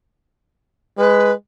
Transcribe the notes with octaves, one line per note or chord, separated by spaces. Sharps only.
G#3 B4